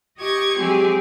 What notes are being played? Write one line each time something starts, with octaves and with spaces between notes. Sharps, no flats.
G4 D#5 C#6 G#6
F#3 G#3 C4 G4 G#4